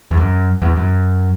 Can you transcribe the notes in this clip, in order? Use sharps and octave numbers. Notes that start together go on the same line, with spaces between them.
E2
F#2
E2
F#2